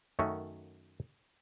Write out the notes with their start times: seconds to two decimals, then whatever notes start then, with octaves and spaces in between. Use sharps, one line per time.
0.19 F#2 D#3 A3 C#4 F#4